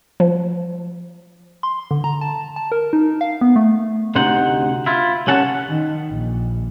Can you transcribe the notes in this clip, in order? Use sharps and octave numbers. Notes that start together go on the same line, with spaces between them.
F3
C6
D3
A#5
A5
A5
A#4
D#4
F5
B3
A3
D2 C3 D#4 C5 F#5
E4 F4
C2 C3 C#4 F#5 A5
D#3
A#1